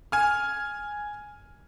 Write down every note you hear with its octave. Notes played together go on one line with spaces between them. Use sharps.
G#5 F6